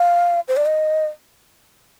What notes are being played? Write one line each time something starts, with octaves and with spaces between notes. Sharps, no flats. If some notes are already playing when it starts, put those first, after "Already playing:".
Already playing: F5
C5
D5
D#5